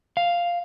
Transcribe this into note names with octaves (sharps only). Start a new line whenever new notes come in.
F5